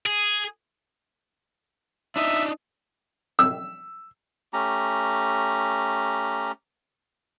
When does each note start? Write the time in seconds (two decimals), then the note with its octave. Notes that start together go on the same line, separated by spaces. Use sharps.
0.06 G#4
2.16 D4 D#4 D#5 E5
3.39 E6
4.53 A3 C#4 G4 A#5